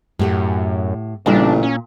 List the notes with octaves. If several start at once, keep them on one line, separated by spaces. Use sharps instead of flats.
F#2 A2 G4 F#5
A1 A#2 C#3 G3 D4
C#4